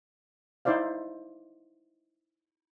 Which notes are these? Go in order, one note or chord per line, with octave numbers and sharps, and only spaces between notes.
D#4 E4 C5 D5 F5